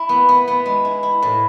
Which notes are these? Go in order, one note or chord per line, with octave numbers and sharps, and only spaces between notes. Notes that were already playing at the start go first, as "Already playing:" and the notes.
Already playing: E4
B3
B3
B3
G#3
E4
E4
A2